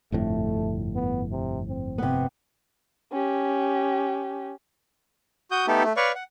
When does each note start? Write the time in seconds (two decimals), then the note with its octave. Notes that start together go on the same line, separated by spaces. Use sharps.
0.12 G1 F2 A2 A3
0.95 B3
1.32 C3
1.68 C4
1.98 C3 B3
3.12 C#4 G4
5.51 F#4 D#6 G6
5.67 A3 B3 D#4 G4 A4
5.83 A3
5.97 B4 C#5 D5 F5 C#6
6.15 F#5